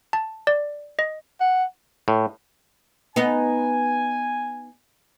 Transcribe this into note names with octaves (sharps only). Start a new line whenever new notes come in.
A5
D5
D#5
F#5
A2
B3 D#4 G#5